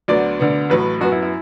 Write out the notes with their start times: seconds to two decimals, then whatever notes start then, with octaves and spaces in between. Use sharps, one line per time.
0.08 D2 D3 F#3 B3 D5
0.39 D2 D3 B3
0.70 A1 A2 F#3 B4
1.01 F#2 F#3 B3 F#4
1.12 E4
1.23 E4